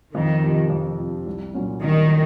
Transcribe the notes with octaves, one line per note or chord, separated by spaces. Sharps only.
F2 D#3
C3 F3
F2
C3 F3
C2
A#2 F#3 C#4 F4
C2 D#3